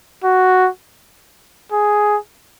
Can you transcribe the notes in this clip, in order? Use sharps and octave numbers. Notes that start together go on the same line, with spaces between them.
F#4
G#4